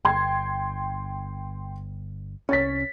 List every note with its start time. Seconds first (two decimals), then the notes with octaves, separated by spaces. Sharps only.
0.05 G1 G5 C6 G#6
2.49 C2 C#4 C#5 A6 B6